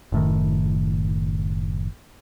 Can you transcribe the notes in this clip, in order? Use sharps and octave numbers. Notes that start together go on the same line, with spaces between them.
F#1 A2 D#3